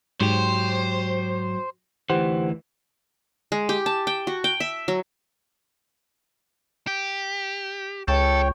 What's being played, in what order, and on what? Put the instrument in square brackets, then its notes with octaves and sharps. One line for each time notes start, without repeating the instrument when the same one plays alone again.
[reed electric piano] G#2 C6 [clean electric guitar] F#3 G4 [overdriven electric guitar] C5
[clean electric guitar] D2 E3 [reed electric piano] G4 C5 F#5
[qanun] G#3
G4
A5
G5
F#4
G5
E5
F#3
[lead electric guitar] G4
[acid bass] C#2 [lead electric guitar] A4 [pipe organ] C#5 G5